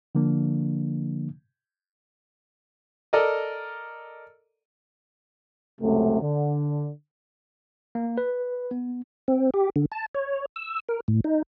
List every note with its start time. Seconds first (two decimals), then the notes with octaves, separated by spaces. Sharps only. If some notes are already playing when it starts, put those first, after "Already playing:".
0.15 D3 F3 A#3 D4
3.13 A4 A#4 D5 D#5
5.81 C#2 F#2 C3 A3
6.21 D3
7.95 A#3
8.18 B4
8.71 B3
9.28 C4
9.54 G4
9.76 D3
9.92 A5
10.15 C#5
10.56 E6
10.89 A#4
11.08 A2
11.24 D#4